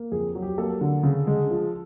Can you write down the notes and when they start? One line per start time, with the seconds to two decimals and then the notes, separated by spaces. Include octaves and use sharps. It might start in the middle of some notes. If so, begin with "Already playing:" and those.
Already playing: A#3
0.12 F2 G#4
0.35 F#3
0.42 G4
0.58 A#3 A4
0.81 D3
1.03 C#3
1.27 G#3
1.50 F3